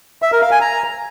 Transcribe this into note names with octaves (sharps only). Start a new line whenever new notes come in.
E5
A#4
F5
G#5
A#5